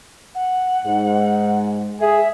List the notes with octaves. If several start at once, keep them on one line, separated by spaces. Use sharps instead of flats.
F#5
G#2
G#4 E5